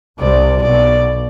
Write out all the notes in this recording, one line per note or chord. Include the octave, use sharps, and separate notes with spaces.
C2 C3 D5
B1 B2 D5